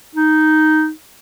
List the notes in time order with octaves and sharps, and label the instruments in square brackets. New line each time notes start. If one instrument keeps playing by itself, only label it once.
[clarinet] D#4